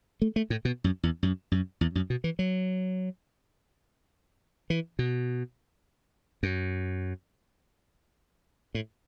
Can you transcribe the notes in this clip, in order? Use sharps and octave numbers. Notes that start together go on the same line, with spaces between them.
A3
A3
A2
B2
F#2
E2
F#2
F#2
E2
F#2
B2
E3
F#3
E3
B2
F#2
A2